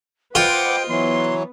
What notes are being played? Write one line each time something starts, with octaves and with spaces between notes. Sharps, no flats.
F4 B4 C5 D#5 F#5 G5 D6
E3 F#3 B3 C6